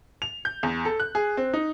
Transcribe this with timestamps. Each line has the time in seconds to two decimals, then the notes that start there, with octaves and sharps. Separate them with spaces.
0.22 F7
0.45 G6
0.63 E2
0.85 A4
1.00 F#6
1.15 G#4
1.37 C4
1.53 D#4